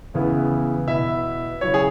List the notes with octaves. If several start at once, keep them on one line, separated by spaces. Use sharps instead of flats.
E2 C#3 E3 B3 E4
B2 B3 E4 E5
C#3 F#3 E4 C#5
G#4